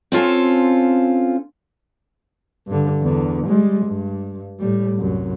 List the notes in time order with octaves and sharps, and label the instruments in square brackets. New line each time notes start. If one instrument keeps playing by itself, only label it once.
[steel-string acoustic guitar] C4 C#4 F4 A4
[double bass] G2 D3
E2 D3
G3 G#3
G2
A2 G3
C2 F#2